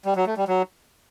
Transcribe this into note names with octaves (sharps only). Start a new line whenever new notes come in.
G3
F#3
A3
G3
F#3